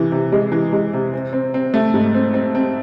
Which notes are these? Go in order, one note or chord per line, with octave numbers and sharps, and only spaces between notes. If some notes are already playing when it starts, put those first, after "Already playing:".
Already playing: C3 E3
C3
G#3
E3
G#3
C3
C4
C4
C4
A3
G#2
C4
C4
C4